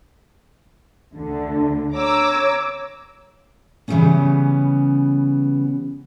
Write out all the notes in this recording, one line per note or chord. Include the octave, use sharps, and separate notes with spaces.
D2 D3
C#5 A#5 D6 E6
C#3 E3 F#3 G3 B3 C#4